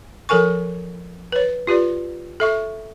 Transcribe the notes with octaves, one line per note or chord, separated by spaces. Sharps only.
F3 A4 A#4 G#5 C#6
B4 C#5
F4 G4 B4 D5
A4 E5 C#6